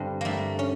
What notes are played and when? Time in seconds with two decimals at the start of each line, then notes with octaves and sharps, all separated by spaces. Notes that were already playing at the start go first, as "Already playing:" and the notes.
Already playing: G2 D3 C4 D4
0.21 G2 A3 A#3
0.59 C#4